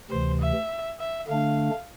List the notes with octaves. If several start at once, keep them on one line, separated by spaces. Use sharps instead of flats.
D2 C3 E3 C5
E5
E5
D3 A3 D4 F5